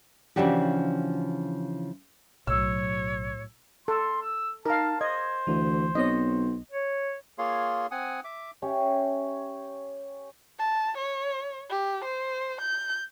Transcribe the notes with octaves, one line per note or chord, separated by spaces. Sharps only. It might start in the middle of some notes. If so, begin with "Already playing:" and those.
C#3 E3 F3 D4 F#4 G4
B1 A2 F#3 C#5 E6
A4 C6
E6
D#4 A#4 F5 A5
C5 D#5 G#6
D2 E3
B1 C4 C#5 D#5
C#5
A#3 F4 G#4 C#5 F5 C6
C4 F#5 G#5 D#6
E5 D6
C#4 G4 C#5 E5
A5
C#5
G4
C5
G6